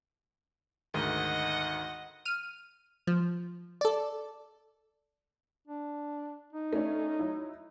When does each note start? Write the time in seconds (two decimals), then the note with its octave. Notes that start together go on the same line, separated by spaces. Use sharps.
0.94 D2 G#2 D#3 D#5 F#5
2.25 F6 D#7
3.07 F3
3.81 A4 D5
5.67 D4
6.52 D#4
6.73 A3 C#4 D4
7.19 F#3 E4